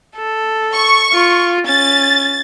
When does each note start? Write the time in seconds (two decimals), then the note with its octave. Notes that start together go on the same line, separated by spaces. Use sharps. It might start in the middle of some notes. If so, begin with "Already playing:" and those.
0.16 A4
0.74 C#6
1.12 F4
1.67 C#4 A6